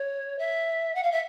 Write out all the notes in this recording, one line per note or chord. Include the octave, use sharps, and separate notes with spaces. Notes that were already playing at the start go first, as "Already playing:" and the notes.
Already playing: C#5
E5
F#5
F5
E5